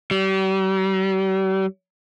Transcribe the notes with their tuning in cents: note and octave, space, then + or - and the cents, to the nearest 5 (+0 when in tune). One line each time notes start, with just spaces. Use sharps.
G3 -40